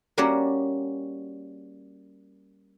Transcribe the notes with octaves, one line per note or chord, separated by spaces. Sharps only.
G3 A#3 C#4 F#4 C#5 D5